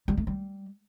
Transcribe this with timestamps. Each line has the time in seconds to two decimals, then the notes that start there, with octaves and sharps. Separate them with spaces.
0.08 G3
0.17 A3
0.27 G3